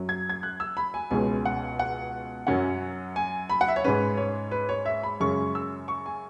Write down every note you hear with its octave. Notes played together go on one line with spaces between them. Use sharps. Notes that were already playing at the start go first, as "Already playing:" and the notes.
Already playing: F#2 F#3 C#4
G#6
G#6
F#6
E6
B5
G#5
C#2 B2 G#3 C#4 G#5
F#5
F#5
F#2 F#3 C#4 F#5
G#5
B5
F#5
E5
C#5
G#2 G#3 C#4 B4
C#5
B4
C#5
E5
B5
F#2 C#3 G#3 C#4 C#6
E6
C#6
G#5